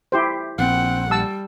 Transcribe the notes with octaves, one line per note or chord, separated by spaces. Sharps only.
E4 G4 C5
A#1 C4 F#5
G3 A5 E6